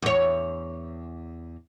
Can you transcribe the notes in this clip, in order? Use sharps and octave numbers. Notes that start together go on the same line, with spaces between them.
E2 C#5